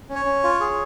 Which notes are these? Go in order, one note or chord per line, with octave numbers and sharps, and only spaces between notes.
C#4
C#5
C#4
F4
G#4